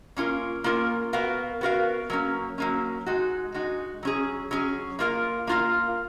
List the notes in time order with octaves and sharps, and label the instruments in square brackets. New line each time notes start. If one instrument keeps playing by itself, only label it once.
[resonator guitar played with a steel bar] A#3 C#4 F4 A#4
A#3 C#4 F4 A#4
B3 F#4 A#4 F5
B3 F#4 A#4 F5
F#3 A#3 C#4
F#3 A#3 C#4
G#3 D#4 F#4
G#3 D#4 F#4
F#3 C#4 G#4
F#3 C#4 G#4
A#3 F4 A#4 F5
A#3 F4 A#4 F5